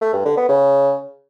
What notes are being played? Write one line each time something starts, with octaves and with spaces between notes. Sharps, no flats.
A3
G2
D3
B3
C#3